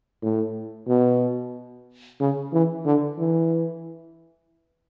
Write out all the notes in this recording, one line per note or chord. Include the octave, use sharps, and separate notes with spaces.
A2
B2
C#3
E3
D3
E3